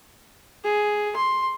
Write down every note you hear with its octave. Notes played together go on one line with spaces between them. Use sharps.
G#4
C6